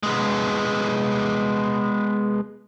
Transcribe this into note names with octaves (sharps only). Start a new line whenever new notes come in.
G#3 B3